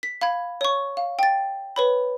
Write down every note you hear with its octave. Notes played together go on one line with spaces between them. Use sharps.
B6
F5 B5 G#6
C#5 C#6
F5
G5 A6
B4 C#5 B5